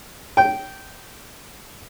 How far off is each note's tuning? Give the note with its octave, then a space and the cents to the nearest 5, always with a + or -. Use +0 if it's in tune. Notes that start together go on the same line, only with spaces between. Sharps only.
G5 -15